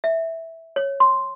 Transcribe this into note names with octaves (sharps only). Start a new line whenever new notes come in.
E5
C#5
C6